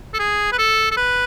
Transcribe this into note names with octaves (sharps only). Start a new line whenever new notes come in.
A4
G#4
B4
A4
A4
B4